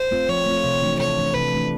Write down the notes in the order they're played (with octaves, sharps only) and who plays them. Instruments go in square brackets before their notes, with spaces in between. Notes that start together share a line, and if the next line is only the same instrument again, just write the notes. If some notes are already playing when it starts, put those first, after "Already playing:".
Already playing: [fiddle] C5
[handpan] A3 C4 F4
[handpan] F3 [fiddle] C#5
[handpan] A3 C4 F4
C3
E3 A3 D4
[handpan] C3 [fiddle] C#5
[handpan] E3 A3 D4
[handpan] C3 [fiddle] B4
[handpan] E3 A3 D4